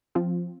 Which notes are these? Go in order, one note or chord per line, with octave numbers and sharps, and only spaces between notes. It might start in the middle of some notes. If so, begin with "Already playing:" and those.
F3 C4 F4